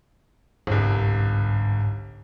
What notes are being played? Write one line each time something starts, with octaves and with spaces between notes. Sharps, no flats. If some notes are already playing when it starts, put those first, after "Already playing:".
G1 C2 G#2